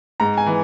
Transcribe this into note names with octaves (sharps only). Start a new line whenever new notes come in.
G#2 A#5
G#5
E3